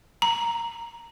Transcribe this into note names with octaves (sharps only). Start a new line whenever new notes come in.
A#5